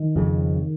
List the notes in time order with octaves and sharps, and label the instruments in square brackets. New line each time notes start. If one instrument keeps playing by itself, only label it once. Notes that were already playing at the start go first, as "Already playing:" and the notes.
Already playing: [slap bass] D#3
F2 C#3